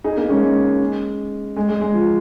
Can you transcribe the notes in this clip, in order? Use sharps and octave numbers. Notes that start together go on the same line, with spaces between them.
D#4 G#4
A#3 D#4
G#3 C#4
G#3
G#3
G#3
G#3
F3